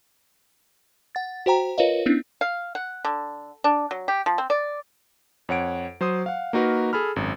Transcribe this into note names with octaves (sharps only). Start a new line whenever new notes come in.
F#5 A6
F#4 C5 G5 A#5
F4 A#4 B4 C#5 D#5 F5
B3 C#4 D4 E4
F5
F#5
D3
D4
F#3
G4
F3
C4
D5
F2 C#5 F#5 D7
F#3 C5 C6 D#6
F5 F#5
A#3 D#4 F#4 A#4 B4
G#4 A4 B5 F6
G#1 F#2